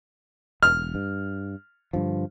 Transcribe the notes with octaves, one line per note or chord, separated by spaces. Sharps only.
E1 F6
G2
G2 D3 F3